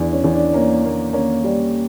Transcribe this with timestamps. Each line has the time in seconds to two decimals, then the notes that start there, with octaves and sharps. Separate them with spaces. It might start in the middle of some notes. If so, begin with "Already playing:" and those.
Already playing: E2 D4
0.13 C#4
0.24 E2
0.33 D4
0.54 A#3 C#4
0.84 A#3
1.13 A#3 C#4
1.44 G3